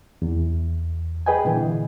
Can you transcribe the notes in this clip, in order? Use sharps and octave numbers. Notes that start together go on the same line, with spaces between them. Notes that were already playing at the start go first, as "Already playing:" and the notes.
E2
G#4 B4 D#5 G5 G#5
A#2 D3 E3